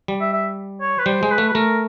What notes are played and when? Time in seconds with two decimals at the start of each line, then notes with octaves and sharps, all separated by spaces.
0.08 G3
0.21 E5
0.33 E5
0.81 C#5
0.99 B4
1.06 G3 C5
1.23 G#3
1.31 B4
1.38 A3
1.48 B4
1.55 A3 A#4